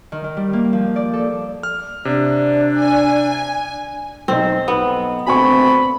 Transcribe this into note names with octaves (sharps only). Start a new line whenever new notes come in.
D#3
D#3
G3
A#3
F3
D5
A4
F6
C3 D4 D5
G#5
B1 C4 D#4
B3
D3 A3 C4 F#4 G#5 B5 C#6